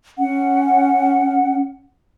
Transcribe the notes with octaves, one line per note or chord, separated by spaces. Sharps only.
C#4 F#5